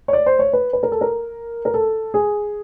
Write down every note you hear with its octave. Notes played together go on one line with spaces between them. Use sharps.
C#5
D5
C5
C#5
B4
B4
A#4
A4
A#4
A#4
A4
G#4